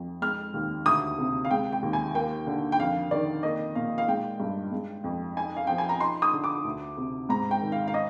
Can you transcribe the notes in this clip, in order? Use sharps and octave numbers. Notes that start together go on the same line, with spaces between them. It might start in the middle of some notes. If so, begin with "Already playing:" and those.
Already playing: F2
G#3 F6
D#2
D2 D#6
C3
F5
G#3 G5
G5
D#2
G#5
A#3 G5
D3
G5
F2 F5
D#3 D5
A#3 D#5
A#2 F5
F5
G#3 G5
G2
G#3
F2
D#4 G#5
F5
F3 G5
G#5
A#5
D#4 C6
D#6
D3
D6
D2
C3
G#2 A#5
G5
D#3
F5
F5
D#5